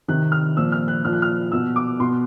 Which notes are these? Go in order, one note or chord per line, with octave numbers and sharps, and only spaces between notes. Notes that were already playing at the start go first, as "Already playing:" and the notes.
C3 D#3 F#6
F6
A#2 F3 E6
F6
F#6
A#2 F3 F6
F#6
F6
B2 E6
D6
B2 C6